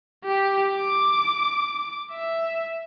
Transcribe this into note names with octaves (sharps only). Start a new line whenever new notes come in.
G4
D6
E5